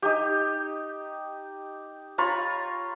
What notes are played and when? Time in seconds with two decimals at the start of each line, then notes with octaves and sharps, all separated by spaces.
0.02 D#4 G4
2.18 F4 C#5 A#5 B5